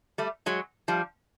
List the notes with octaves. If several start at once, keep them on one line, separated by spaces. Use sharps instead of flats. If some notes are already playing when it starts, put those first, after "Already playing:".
G3 A3
F#3 G#3
F3 G3